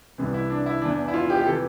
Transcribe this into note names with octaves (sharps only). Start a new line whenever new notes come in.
C2 C3 E3
E4
D4
E4
E2 E3 D4
E4
F4
G4
G4
C3 E3 A4